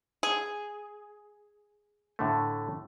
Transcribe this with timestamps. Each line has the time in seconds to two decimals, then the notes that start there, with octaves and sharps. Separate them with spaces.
0.23 G#4
2.19 A2 D3 A3